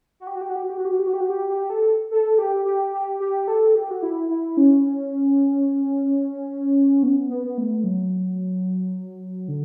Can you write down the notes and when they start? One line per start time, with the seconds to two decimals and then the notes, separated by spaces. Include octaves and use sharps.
0.20 F#4
0.27 G4
0.35 F#4
0.41 G4
0.49 F#4
0.56 G4
0.63 F#4
0.70 G4
0.78 F#4
0.85 G4
0.91 F#4
0.99 G4
1.07 F#4
1.13 G4
1.21 F#4
1.30 G4
1.49 G4
1.70 A4
2.11 A4
2.38 G4
2.66 G4
2.93 G4
3.20 G4
3.48 A4
3.75 G4
3.91 F#4
4.02 E4
4.30 E4
4.57 C#4
7.03 B3
7.29 B3
7.45 B3
7.58 A3
7.84 F#3
9.48 D3